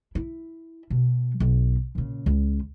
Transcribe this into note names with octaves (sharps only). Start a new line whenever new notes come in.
E4
B2
B1
A#2 C#3
C#2